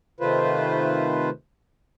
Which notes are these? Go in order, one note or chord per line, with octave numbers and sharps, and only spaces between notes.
C3 D#3 A3 F4 B4 C5